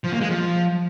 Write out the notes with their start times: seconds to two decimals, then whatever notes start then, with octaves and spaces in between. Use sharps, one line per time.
0.04 F3
0.12 A#3
0.21 G#3
0.29 F3